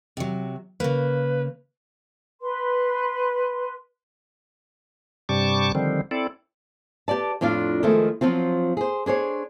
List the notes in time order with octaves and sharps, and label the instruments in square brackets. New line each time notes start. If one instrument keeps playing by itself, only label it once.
[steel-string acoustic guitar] C3 F#3
[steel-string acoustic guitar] C#3 A#3 [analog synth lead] B4
[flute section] B4 C6
[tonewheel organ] G2 C3 G3 A5 C#6 D6
D3 D#3 F3 G3 C4
C4 E4 A4 D5
[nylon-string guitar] G4 B4 D5 A5
F2 A2 D4 F4 F5
D#3 F3 G#3 A3 E4
F3 F#3 C4 F4
G#4 C5
D4 G#4 C5 C#5